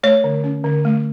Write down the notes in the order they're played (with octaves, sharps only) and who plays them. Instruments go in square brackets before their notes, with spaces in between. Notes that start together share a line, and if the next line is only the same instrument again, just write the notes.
[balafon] A3 C#5
D3
C#4
D3
A3